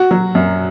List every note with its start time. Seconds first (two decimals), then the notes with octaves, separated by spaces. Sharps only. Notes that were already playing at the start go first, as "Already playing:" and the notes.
Already playing: F#4
0.11 F#3
0.35 F#2